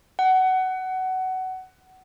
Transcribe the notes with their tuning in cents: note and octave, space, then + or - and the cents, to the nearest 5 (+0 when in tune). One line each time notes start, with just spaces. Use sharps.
F#5 +20